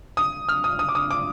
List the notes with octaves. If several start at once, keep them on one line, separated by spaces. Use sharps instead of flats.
D#6
F6
D#6
D#6
D6
D#6
D6